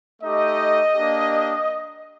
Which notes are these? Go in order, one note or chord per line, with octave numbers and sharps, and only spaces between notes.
A3 D#4 G4 D#5
A#3 D4 G4